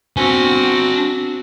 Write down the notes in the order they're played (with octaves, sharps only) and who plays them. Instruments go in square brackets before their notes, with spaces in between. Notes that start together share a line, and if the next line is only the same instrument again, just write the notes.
[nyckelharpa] C4 F#4 [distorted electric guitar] D4 G#5